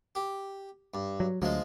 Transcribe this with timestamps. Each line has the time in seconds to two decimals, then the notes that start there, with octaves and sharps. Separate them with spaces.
0.15 G4
0.94 G2
1.20 F#3
1.42 D2 F3 F#3 G#3